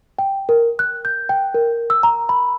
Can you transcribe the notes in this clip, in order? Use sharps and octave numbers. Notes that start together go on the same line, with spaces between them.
G5
A#4
F#6
G6
G5
A#4
E6
A#5
B5